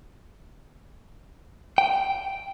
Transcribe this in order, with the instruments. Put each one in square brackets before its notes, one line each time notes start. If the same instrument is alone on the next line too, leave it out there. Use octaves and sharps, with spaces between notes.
[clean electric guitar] G5